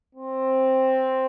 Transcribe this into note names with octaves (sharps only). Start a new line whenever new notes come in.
C4